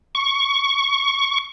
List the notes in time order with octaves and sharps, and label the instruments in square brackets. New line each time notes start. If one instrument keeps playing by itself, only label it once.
[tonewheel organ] C#6